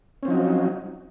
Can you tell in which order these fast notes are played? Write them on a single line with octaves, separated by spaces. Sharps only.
C#4 C4 F3 D#4 F#3